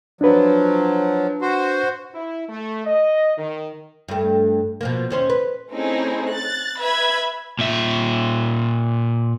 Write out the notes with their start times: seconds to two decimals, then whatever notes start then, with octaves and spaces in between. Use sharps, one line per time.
0.21 F3 F#3 D4 B4
1.42 F#4 C5
2.13 E4
2.49 A3
2.85 D#5
3.38 D#3
4.08 G2 A3
4.81 B2 F3 A#3
5.10 D#2 C#4 C5
5.30 B4
5.73 A3 C4 C#4 D#4 E4 G#4
6.31 F#6 A6
6.78 B4 E5 B5 G#6
7.59 A#2 E5